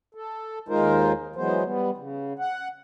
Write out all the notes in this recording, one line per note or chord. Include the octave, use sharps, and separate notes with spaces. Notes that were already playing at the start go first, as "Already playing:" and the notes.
A4
D#2 G#3 D#4 F4 A#4 C5
E3 F#3 G#3 B3 C5
G3 B3
C#3
F#5